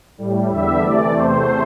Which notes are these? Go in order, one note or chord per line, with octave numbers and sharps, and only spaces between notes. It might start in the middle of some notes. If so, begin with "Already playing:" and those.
A2 G3
E2 D3 G3 E5
C3 E3 A3 D5
E2 C3 A3 C5